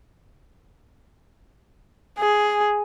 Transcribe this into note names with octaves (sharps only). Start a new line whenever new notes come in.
G#4